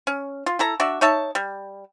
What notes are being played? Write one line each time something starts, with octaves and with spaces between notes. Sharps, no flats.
C#4
F4
E4 A4 A#5
D4 F#4 D5 E5
D#4 C#5 E5 A5
G3